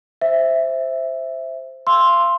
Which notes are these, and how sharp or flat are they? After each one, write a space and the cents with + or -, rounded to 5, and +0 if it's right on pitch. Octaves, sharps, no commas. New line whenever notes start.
C5 +0 E5 +0
F5 -30 C6 +5 E6 +0